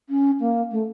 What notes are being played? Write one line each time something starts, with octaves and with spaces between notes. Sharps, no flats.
C#4
A#3
A3